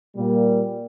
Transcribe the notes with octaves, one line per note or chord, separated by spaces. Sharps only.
A#2 G3 A#3